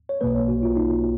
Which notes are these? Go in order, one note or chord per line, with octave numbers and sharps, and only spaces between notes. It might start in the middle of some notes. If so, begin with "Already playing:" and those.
C#5
B1 B2 A#3 B4
C#5
F#4
F4
D#4